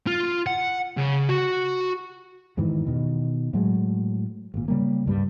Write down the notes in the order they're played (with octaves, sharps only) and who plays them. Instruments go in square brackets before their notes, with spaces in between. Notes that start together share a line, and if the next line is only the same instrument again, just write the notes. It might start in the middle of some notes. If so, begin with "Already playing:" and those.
[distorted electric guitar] F4
F#5
C#3
F#4
[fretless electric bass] E2 G#2 D#3 E3
B2 D#3
A2 F#3 G#3
G#1 A#2
C#3 G3 A#3
C#2 G2 G3